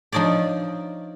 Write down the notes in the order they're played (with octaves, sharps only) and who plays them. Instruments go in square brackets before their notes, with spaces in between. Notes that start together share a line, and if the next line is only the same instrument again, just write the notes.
[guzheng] F3 D4 D#4 C#5 D5